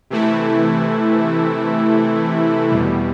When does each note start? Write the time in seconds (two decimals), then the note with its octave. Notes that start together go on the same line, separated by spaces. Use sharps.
0.10 C3 E3 A3 E4
2.70 E2 B2 G3